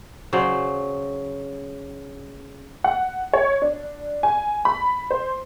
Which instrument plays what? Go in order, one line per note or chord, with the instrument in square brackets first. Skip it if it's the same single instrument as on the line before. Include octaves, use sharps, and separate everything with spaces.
[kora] C#3 F#3 C5 D5
[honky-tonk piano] F#5
C#5
D4
G#5
B5
C5